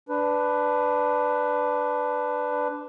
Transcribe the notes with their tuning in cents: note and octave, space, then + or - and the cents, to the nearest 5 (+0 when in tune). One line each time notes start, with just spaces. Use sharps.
D4 +0 B4 +10